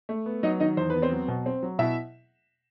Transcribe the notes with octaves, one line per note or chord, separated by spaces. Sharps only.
A3
B3
F#3 D#4 D#5
D#3 D#4 D#5
E2 C5
B3 B4
C4 C5
F#3
B2
C4
F#3
B2 E4 E5